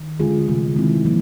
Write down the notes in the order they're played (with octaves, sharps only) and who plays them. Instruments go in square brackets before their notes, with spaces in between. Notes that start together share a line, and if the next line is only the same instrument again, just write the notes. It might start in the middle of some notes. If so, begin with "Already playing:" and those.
Already playing: [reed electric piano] D#3
[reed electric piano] D3 [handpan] G#3 C#4 F4 G#4
[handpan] C3 E3 A3
[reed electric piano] D#3 [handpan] G#3 C4 E4
[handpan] F3 A#3